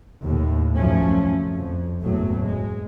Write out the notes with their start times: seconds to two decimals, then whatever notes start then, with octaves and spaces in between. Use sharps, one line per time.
0.22 D#2 A2
0.76 C2 F#2 F3 A3 C#4
1.53 F2
2.01 F#1 E2 A2 F#3 A3
2.43 G#3